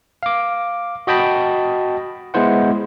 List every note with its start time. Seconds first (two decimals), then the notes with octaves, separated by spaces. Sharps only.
0.23 F5 D6
1.07 F#4 D#5 G5 A5 B5
2.34 G#3 B3 E4 C5 F#5